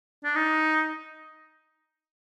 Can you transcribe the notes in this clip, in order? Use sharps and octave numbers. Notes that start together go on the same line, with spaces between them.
D4
D#4